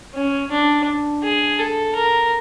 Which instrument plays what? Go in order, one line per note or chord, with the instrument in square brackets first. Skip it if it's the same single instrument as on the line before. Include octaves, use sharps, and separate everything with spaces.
[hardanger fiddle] C#4
D4
G#4
A4
A#4